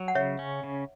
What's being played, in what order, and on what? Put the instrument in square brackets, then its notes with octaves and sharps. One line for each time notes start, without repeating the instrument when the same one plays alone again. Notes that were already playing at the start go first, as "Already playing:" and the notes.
Already playing: [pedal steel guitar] F#3
[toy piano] F#5
[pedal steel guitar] C#3 [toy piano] C#5 E5
[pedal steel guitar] C#4
C#3